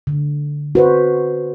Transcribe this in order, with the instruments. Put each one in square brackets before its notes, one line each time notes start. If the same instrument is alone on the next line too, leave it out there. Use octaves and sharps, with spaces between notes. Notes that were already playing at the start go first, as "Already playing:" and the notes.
[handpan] D3
F#4 B4 C5